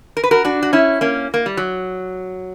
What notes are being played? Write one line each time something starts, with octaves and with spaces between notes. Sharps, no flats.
A#4
B4
F#4 A#4
D4 F#4
F#4
C#4 E4
A#3 C#4
A#3
G3
F#3